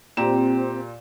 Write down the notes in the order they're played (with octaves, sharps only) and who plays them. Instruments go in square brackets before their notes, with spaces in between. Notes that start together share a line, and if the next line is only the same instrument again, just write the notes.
[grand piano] A#2 [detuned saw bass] C4 [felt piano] G4 A#5 E7